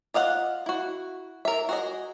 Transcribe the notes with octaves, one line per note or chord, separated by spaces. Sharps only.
F4 D#5 F5 F#5
E4 F#4
A#4 E5
F#4 G#4 D#5